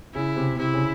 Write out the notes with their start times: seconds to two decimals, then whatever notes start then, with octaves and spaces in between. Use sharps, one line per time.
0.15 C#3 E4
0.36 C3
0.59 C3 E4
0.73 C#3